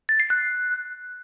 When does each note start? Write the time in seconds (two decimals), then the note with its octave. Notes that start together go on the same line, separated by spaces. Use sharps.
0.09 A6
0.20 C7
0.30 F#6